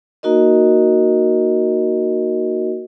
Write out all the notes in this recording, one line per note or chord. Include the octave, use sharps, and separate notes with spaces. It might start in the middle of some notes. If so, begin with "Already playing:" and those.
A#3 D#4 F#4 A#4 D#5